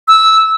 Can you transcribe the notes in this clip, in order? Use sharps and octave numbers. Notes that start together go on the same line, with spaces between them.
E6